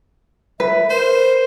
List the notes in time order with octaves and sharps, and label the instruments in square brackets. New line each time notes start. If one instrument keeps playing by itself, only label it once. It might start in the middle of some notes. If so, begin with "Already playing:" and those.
[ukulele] B4 [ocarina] E5
[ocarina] A#4 [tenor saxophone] C5